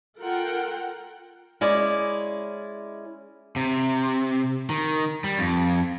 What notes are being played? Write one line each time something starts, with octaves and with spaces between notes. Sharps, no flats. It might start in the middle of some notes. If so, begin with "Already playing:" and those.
F4 A4 A#4 F#5 G5
G#3 C#4 E4 D5
C3
D#3
G3
F2